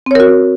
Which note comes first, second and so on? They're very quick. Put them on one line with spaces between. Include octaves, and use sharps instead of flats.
C4 C#5 A#4 F#4